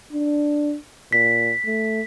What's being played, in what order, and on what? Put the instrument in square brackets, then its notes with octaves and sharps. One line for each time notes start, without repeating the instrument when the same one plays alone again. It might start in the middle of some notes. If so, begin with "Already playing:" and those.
[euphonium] D4
[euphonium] A#2 [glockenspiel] B6
[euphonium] A3